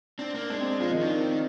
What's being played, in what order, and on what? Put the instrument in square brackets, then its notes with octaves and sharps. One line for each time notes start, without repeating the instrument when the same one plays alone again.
[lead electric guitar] C4 [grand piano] D4
[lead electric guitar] A#3 [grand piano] D4
[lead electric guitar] G#3 [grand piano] D4
[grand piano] C4
D4
[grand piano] F3 F4 [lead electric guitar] G#3
[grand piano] D#3 D#4
[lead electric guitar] D#3 [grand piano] D4
[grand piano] C4